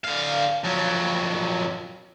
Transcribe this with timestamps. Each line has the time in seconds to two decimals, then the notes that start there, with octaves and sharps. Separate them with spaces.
0.04 D3 F5
0.64 F2 F#3